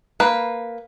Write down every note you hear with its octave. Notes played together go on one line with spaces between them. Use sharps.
A#3 B4